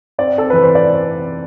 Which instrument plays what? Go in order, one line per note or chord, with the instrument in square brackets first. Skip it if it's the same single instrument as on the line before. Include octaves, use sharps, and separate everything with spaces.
[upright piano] C4 D5
A4
E3 B4
C5
D5